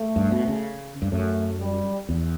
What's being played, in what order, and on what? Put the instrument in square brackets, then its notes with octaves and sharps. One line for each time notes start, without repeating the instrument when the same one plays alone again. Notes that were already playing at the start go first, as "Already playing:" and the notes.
Already playing: [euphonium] A3
[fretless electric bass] G2
B2
C#3
G2
[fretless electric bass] F#2 [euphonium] A3
[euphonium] G3
[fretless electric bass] E2